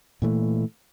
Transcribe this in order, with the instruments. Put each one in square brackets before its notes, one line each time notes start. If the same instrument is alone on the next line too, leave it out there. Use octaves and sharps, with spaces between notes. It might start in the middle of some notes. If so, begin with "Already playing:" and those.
[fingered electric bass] A#2 E3 A3